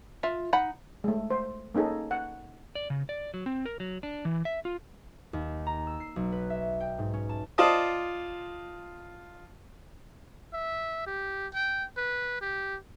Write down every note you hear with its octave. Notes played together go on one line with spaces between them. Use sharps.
F4 E5
D#4 F#5 B5
G#3 A3
C5
A#3 C#4 D#4 G#4 A4
F#5
D5
C#3
D5
F#3
C4
A#4
F#3
D4
E3
E5
F4
D#2
A#5
E6
C7
B1
B4
E5
G5
G#2
C#4
A5
F4 C5 D5 D#5 A5 D#6
E5
G4
G5
B4
G4